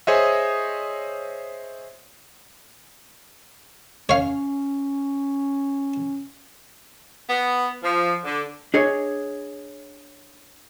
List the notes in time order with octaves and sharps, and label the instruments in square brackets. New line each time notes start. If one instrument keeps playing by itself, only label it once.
[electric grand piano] G#4 C5 C#5 D#5 E5
[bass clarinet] C#4 [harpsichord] C#5 F5
[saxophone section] B3
F3
D3
[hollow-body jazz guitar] D4 G#4 C#5 D#5